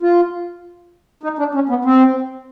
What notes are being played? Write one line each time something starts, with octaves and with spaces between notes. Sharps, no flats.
F4
D#4
D4
C#4
B3
C4